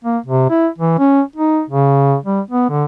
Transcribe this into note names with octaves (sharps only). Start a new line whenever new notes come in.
A#3
C3
E4
E3
C#4
D#4
C#3
G3
B3
D3